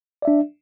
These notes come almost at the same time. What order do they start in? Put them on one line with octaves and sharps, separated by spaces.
D5 E5 D4